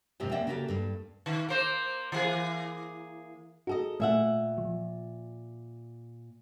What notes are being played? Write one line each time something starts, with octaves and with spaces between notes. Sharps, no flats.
D#2 G#2 C3 F3 G4 C5
A#3 C#4 D5 E5 F#5 G5
C#3 A#3 F#4 G4 A4 A5
G2 A4
D#3
A#3 C5
E3 A#3 G#4
D#4 F#4 G#4 A4 D#5
A#2 A3 E5 F#5
F3